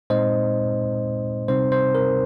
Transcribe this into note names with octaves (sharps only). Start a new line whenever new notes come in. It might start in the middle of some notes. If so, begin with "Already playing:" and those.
A#2 G#3 C4 D#4 C5 D#5
C3 G3 C4 D#4 C5
C5
A#4